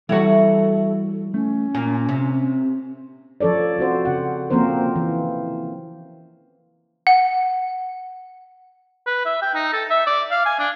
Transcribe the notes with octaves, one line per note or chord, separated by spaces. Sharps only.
E3 G3 E4 F#4 A4 C#5
A3 C#4
A#2 G#5
C3
F3 C#4 A4 C#5 D5
C4 F#4 C5
C#3 F#5
F3 A#3 C4 C#4 A#4 C5
E3
F#5
B4
E5
G5
D#4
A4
E5
D5
F5
G#5
D4